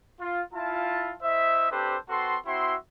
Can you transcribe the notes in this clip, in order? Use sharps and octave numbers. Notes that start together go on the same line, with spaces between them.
F4
E4 F4 A5
E4 C5 D#5 E5
C4 D4 G4 A4 B4 C5
C4 F#4 A4 B4 C6
C4 E4 F#4 E5 C6